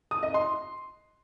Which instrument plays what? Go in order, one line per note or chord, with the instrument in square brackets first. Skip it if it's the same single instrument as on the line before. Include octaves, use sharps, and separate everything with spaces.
[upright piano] D#6
D#5
C6